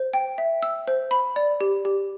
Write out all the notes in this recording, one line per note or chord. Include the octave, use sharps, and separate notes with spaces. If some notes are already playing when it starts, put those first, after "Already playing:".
Already playing: C5
G5
E5
E6
C5
B5
D5
G4
G4